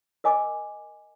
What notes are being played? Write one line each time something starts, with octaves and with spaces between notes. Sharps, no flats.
A#4 D#5 G#5 D6